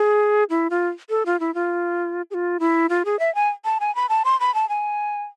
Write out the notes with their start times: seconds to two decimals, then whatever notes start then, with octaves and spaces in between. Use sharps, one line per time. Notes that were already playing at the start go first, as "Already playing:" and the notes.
Already playing: G#4
0.50 E4
0.70 F4
1.10 A4
1.26 F4
1.40 E4
1.54 F4
2.31 G#4
2.34 F4
2.60 E4
2.89 F4
3.05 G#4
3.19 E5
3.35 G#5
3.65 A5
3.80 G#5
3.95 B5
4.09 A5
4.25 C6
4.40 B5
4.55 A5
4.69 G#5